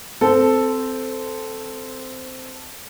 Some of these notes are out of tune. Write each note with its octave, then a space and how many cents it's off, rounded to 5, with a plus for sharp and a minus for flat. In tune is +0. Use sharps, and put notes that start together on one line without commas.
C4 -15 A4 +0